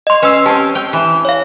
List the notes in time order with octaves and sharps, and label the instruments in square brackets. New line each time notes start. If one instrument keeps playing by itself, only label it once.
[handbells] D#5 C6
[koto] C#4 [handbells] B4 E6 C7
[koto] C4 C#4 [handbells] G4 A5
[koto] G5
E3
[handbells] C#5 F5